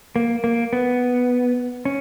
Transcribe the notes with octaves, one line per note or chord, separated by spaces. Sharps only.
A#3
A#3
B3
C#4